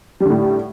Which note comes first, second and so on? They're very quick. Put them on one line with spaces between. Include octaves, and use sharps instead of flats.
G3 D3 A2